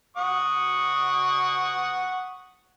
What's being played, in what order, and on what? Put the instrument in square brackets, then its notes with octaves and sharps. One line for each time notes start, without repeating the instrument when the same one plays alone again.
[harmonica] F#5 C#6 D#6